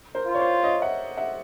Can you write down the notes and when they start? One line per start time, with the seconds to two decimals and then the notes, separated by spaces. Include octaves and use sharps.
0.15 A#4 C5
0.27 F4
0.35 C#5
0.39 C5 D5
0.63 C#5 D#5
0.82 E5 F#5
1.17 E5 F#5